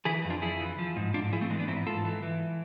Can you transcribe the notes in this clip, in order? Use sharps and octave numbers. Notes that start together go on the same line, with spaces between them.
E3 E4 G#4
F2
D4 F4
F2 E4 G#4
E3
F3
G#2
G#2 D4 F4
F3 E4 G#4
A3 C4
E3 G#3
B3 D4
G#2 C4 E4
G#2 F4 A4
E3
E3